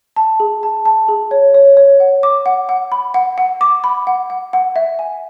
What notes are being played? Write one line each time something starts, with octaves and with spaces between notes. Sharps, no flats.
A5
G#4
A5
A5
G#4
C#5
C#5
C#5
F#5
D6
F#5
F#5
B5
F#5
F#5
D6
B5
F#5
F#5
F#5
E5
G#5